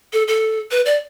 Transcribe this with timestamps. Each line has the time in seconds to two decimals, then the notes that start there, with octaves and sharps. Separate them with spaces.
0.13 A4
0.28 A4
0.71 B4
0.86 D5